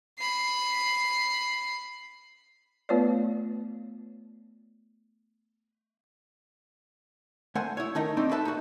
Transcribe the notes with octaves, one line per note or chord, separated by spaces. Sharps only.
B5 C7
A3 B3 F4 B4 C#5 D5
A3 C5 F#5 G#5
E4 C#5
D#3 A3 C#4 D#4 A#4
A3 C4 D4 D#4
A4 B4 E5 A5
D#4 F#4